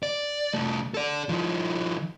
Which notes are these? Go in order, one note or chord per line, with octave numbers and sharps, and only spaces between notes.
D5
C2 A3
A4 D5
D#3 F3